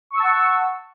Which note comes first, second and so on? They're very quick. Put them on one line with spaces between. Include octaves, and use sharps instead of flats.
C#6 E6 A5 F#5